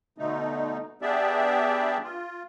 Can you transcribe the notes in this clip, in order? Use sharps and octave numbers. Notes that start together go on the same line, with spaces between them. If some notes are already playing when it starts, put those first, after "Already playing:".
B2 D3 A3 D#4
B3 D4 G4 G#4 D5 E5
F4